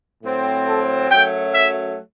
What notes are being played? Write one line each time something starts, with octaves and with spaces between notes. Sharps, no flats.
A2 F#3 C4
A4
F#2 F#3 A3 G5
E5